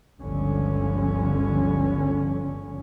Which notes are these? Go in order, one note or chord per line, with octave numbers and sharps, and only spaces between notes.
G1 C#2 D3 F3 C#4